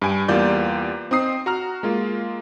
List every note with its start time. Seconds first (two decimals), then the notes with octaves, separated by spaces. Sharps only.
0.02 G2 G#5 D7
0.28 E2 G3 A#3 F4 D5 G6
1.11 C4 D#4 D#6 C7
1.46 F#4 A#5 F6
1.83 G#3 A#3 F4